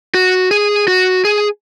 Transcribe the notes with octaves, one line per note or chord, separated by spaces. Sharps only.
F#4
G#4
F#4
G#4